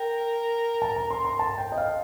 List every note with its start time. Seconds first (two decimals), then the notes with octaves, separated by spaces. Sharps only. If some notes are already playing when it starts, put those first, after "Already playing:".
Already playing: A#4 G5
0.82 A5
0.96 A#5
1.11 C6
1.25 C6
1.39 A5
1.58 G5
1.72 D#5
1.78 F5